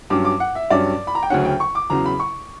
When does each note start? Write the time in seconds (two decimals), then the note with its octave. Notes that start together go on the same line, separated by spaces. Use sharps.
0.10 G2 F#3 C#4 D6
0.25 D6
0.40 F#5
0.55 E5
0.70 G2 F#3 C#4 D5
1.07 B5
1.15 A#5
1.23 G5
1.30 D2 C#3 F#3 C#4 F#5
1.45 G5
1.60 C#6
1.75 D6
1.90 E2 C#3 F#3 A#5
2.06 B5
2.20 C#6